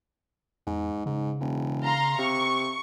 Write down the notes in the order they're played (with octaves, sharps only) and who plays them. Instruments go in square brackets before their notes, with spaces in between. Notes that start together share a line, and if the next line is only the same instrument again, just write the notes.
[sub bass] E2 [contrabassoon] G#2
[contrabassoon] G#2 [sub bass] C#3
[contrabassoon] E1
[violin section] F5 A#5 C6
[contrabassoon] C3 [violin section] C#6